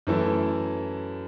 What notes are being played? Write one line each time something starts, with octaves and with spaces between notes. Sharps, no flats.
F#2 E3 A3 E4 A4